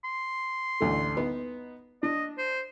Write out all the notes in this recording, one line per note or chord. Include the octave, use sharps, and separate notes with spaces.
C6
A1 D2 A3
B3 D#4
D4 D#5
C5